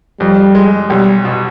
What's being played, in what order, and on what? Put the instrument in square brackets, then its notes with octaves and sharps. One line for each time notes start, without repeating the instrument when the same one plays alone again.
[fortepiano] F2 [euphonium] G3
[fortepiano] G#3
[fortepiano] B1 [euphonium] G3
[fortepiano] B2